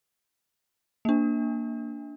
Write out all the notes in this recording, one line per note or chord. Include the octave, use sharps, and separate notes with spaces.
A#3 D4